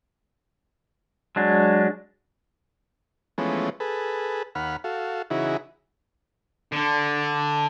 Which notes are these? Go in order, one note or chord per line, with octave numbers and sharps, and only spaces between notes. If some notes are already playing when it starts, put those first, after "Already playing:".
F#3 G#3 D4
E3 F3 G#3 A3 B3 C#4
G#4 A4 B4
D#2 F#5 B5 F6
F#4 A4 F5
C#3 E3 D#4 E4 F#4 G#4
D3